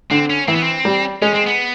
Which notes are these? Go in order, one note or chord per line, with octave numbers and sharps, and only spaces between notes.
D3 C4
C#4
E3 C4
B3
C4
G3
G#3 C#4
C4
B3